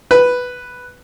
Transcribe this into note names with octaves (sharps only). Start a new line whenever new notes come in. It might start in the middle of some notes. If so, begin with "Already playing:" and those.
B4